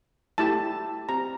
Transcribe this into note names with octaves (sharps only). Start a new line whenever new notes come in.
A3 E4 G4 A5
C4 G4 A#5